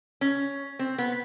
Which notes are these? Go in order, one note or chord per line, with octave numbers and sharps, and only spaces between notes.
C#4
C4
B3